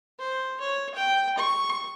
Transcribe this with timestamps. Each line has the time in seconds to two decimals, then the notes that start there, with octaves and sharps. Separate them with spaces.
0.19 C5
0.60 C#5
0.95 G5
1.38 C#6